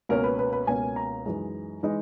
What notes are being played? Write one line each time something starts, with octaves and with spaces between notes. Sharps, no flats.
C#2 B2 A#3 C#4 A#4
B4
B4
B4
C#2 B2 A#3 C#4 G#5
A#5
F#2 E3 G#3 D#4
E3 G#3 D#4